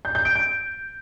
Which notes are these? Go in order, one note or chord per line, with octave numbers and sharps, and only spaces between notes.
G6
G6
D7
G6